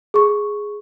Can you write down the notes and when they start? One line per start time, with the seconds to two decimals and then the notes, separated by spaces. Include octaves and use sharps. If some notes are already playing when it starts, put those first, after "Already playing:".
0.14 G#4 C#6